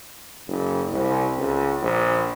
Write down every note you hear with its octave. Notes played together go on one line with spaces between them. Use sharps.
F#1
C2
C#2
A#1